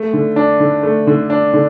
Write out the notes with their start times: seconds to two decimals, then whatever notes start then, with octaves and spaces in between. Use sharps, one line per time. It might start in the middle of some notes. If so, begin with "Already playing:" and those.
Already playing: A3
0.13 D3
0.36 D4
0.60 D3
0.83 A3
1.07 D3
1.30 D4
1.54 D3